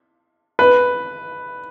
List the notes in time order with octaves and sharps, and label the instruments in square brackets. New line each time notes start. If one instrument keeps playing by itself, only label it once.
[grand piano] B4